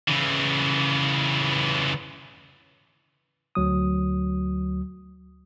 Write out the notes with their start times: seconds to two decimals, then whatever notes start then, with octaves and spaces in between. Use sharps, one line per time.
0.08 C#3 E3
3.55 D2 F#3 D#6